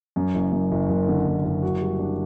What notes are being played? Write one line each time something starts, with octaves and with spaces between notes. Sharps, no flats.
F#2
F#1
F#2
F#1
F#1
D3
F#1
F#1
F#4
G3
D4